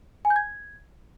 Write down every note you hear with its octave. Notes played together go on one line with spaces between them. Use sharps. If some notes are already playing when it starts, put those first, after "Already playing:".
G#5
G6
G#6